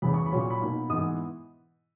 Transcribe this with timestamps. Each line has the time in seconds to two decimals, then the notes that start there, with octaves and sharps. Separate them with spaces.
0.02 E2 C#3 E3 B5
0.14 C#6
0.26 B5
0.32 A#2 F#3 C#4
0.38 C#6
0.50 B5
0.60 B2 A#3 D#4
0.89 G#2 E3 B3 E4 D#6